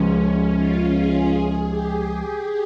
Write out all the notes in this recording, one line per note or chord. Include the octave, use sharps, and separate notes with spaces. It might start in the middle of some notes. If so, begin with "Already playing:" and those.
Already playing: C#2 C#3 F3 G#3 C#4
F4
G#4
G#4
G4